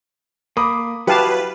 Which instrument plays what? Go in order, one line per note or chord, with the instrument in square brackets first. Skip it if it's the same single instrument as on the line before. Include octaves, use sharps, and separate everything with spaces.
[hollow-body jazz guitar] A#3 [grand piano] B5 D6 D#6
[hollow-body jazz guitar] F#3 E4 F#4 [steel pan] G4 F5 A5 [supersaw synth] B4